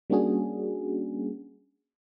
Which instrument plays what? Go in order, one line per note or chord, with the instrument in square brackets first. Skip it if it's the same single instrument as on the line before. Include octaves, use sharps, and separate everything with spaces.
[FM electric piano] G3 A#3 C#4 D4 F#4 G#4